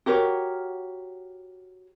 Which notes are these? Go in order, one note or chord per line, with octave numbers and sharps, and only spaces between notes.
F#4 G4 A#4 C#5